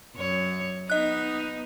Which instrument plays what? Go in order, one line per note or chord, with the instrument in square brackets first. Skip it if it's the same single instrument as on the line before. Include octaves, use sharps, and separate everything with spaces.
[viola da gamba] F#2 C#5
[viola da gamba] B3 D#4 [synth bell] D#5 F#6